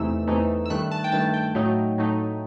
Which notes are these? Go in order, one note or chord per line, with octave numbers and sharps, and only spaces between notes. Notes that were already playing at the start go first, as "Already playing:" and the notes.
Already playing: E2 C3 E3 A3 D#4 E6
E2 C3 E3 A3 D#4
E6
G2 D#3 A3 F#6
A5
G5
G2 D#3 A3 A5
G5
A2 F#3 A3 D#4
A2 F#3 A3 D#4